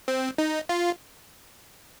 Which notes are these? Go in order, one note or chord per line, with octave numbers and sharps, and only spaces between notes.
C4
D#4
F4